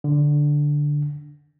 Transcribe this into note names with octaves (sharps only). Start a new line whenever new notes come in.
D3